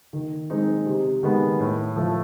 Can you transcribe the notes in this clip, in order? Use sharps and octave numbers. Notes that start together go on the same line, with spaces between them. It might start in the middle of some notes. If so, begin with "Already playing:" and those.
D#3
G#3 C4 D#4
C3
D#3 G#3 B3
A2
F3 A3